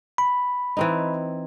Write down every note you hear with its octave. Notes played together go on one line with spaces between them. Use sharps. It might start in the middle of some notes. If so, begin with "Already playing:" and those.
B5
E3 C4 D#4